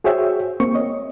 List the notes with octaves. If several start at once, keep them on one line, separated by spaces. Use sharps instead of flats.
F#4 G#4 C5 C#5 E5 G5
A#3 C4 C#6
C#5 D#5